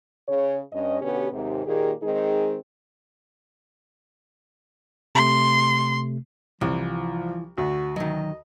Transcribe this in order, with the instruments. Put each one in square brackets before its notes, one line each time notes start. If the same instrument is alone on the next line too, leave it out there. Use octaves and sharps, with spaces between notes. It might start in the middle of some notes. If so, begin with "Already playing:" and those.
[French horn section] C#3 C#5
G2 C#4 D#5
B2 D3 B3 C#4 G4
D#2 G#2 C3
A#2 D#3 A#3 G4 G#4
D#3 G#3 C4 D#4 G#4
[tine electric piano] C3 A3 [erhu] C6
[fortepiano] C2 [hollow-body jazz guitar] E3 [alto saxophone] F3
[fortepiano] D2 [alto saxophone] F#4
[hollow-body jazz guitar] D#3 F#3 [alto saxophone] D#5